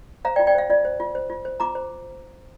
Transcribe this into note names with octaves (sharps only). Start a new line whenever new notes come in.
C5 F5 A#5
D5 G5
F4
D5 G5
C5 F5
F4 D5
C5
F4
C5
F4
C5
F4 A#5 D6
C5